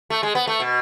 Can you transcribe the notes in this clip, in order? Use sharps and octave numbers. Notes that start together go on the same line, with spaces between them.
A3
G#3
B3
A3
B2